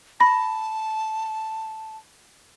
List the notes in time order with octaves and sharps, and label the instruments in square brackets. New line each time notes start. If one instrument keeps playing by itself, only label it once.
[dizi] A5 [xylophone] B5 A#6